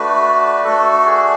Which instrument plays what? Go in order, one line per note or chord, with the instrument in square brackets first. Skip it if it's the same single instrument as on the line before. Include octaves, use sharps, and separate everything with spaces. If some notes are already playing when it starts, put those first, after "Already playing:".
Already playing: [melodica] A3 D4 F#4 B4
A3 D4 F#4 A4
G#4